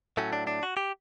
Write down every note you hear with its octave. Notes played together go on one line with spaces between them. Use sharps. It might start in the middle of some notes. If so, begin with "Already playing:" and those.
A2 F#3 A3 C#4
D4
D4
F#4
G4